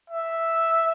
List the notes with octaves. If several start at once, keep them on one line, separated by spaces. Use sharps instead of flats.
E5